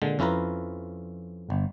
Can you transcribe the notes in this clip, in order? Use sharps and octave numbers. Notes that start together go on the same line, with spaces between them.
A#2 D3 G#3
F2 C#4 E4 F4 B4 A#5
G1